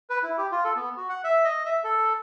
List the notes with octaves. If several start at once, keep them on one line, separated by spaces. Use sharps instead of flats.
B4
E4
G4
F4
A4
B3
F#4
F#5
E5
D#5
E5
A4